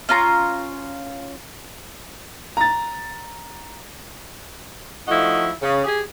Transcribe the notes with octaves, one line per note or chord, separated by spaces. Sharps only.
C#4 F4 A#5
A#5 A6
F3 A3 D#4 E4 F#4
C#3
G4 G#4